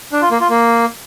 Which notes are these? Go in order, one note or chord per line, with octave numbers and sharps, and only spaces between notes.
D4
F4
A#3
F4
A#3